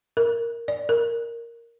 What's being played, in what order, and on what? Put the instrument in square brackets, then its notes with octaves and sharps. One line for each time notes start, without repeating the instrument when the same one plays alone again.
[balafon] A#4
D5
A#4